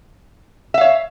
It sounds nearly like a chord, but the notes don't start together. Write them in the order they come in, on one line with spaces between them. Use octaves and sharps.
E5 F5 C#5